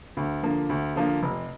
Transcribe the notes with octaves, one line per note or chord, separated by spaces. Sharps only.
D2
D3 F3 A#3
D2
D3 F3 A#3
F1